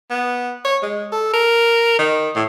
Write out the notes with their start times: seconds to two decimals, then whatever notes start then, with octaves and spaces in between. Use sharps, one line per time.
0.10 B3
0.65 C#5
0.82 G#3
1.12 A4
1.34 A#4
1.99 D#3
2.35 A2